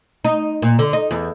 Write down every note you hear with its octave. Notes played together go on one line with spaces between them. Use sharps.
D#4
A#2
D3
D#4
E2